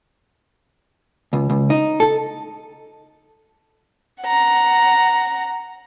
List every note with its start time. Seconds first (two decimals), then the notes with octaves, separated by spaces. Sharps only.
1.33 C#2
1.50 C#2
1.70 D#4
2.00 A4
4.22 F#5 A#5